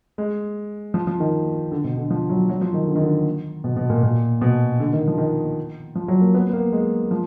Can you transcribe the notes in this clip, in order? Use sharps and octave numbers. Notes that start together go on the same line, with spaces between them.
G#3
F3
F3
D#3
D3
B2
D3
F3
F#3
F#3
F3
D#3
D3
D#3
D3
B2
B2
A#2
A#2
B2
D3
D#3
F3
D#3
F3
F#3
A#3
B3
B3
A#3
G#3
F3